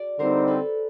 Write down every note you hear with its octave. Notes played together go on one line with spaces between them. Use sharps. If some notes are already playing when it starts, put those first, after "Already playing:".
Already playing: F#4 G#4 D5
D3 G3 C4 D#4 A#4 C5
A4 B4